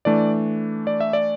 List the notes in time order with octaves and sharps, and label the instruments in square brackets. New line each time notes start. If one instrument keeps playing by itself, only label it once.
[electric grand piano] E3 A3 D4 D5
D5
E5
D5